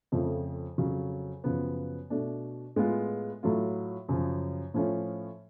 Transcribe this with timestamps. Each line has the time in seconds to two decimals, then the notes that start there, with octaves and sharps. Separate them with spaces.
0.12 F2 C#3 F3 A3
0.78 F2 C#3 F#3
1.44 F#2 C#3 F3 B3
2.10 B2 A3 D4
2.76 A2 G#3 B3 F4
3.43 A2 F#3 A3 F4
4.09 F#2 C#3 F3
4.74 A2 F3 A3 C#4 F4